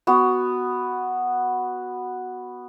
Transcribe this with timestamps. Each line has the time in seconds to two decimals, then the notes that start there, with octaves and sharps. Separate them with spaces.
0.07 B3 F#4